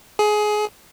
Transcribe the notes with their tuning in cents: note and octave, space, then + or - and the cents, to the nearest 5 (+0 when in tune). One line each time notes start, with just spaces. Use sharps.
G#4 +20